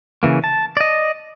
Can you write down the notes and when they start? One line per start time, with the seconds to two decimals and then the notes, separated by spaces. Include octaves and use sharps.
0.23 C#3 E3 A#3
0.44 A5
0.77 D5 D#5